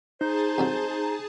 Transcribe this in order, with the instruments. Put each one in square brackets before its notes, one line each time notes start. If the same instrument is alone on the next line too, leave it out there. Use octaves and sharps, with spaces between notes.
[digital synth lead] D#4 [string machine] G#4 A5 [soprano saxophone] C5
[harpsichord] C2 F2 F#3